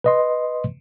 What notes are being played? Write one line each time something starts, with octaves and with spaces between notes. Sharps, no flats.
B4 D#5 C6